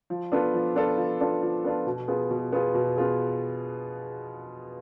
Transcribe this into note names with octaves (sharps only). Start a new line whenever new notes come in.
F3
B3 D4 F4 A4
F3
B3 D4 F4 A4
F3
B3 D4 F4 A4
F3
B3 D4 F4 A4
B2
B3 F4 G#4
B2
B3 F4 G#4
B2
B3 F4 G#4